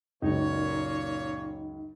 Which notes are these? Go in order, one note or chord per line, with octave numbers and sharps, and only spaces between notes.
C#2 F#2 A#2 D#4 C#5